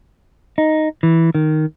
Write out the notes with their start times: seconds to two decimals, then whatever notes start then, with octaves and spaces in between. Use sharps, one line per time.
0.58 D#4
1.03 E3
1.35 D#3